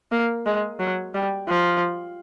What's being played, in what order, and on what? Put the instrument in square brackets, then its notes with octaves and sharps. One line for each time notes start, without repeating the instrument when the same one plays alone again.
[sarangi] A#3
G#3
F#3
G3
F3